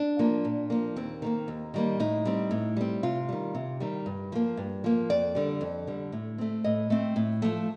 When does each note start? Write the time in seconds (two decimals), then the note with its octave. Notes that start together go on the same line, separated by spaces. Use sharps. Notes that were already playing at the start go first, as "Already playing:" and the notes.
Already playing: D4
0.19 F3 A#3
0.45 A#2
0.70 F3 A#3
0.96 D#2 C4
1.22 D#3 G3 A#3
1.48 D#2
1.74 D#3 G3 A#3
2.00 A2 D#4
2.25 G3 C4
2.51 A2
2.77 G3 C4
3.03 C3 F4
3.29 D#3 G3
3.55 C3
3.80 D#3 G3
4.06 G2
4.32 F3 A#3
4.57 G2
4.84 F3 A#3
5.10 F2 D5
5.35 D3 G3
5.61 F2
5.87 D3 G3
6.12 A2
6.38 A3 C4
6.64 A2 D#5
6.90 A3 C4
7.16 A2
7.42 F3 A3